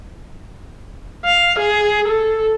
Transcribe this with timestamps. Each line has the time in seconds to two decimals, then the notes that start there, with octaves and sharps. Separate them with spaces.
1.25 F5
1.59 G#4
2.08 A4